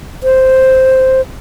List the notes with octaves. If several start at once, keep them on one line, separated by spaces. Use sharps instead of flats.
C5